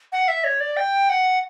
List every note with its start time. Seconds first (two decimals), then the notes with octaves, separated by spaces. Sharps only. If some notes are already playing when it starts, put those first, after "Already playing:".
0.12 F#5
0.28 E5
0.44 C#5
0.61 D5
0.77 G5
1.09 F#5